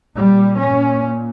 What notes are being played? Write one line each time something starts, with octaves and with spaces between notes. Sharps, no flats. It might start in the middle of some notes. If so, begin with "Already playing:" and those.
A#2 G3
C#4